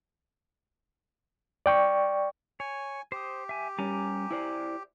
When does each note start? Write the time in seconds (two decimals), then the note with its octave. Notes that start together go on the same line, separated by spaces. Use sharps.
1.66 D5 G5 C#6
2.60 C#5 G#5
3.12 G4 C5 D#6
3.49 E5 G#5
3.79 G3 C#4 G#5 A#5 D6
4.31 E4 C5 D5